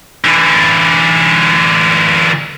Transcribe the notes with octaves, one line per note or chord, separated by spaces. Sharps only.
D3 E3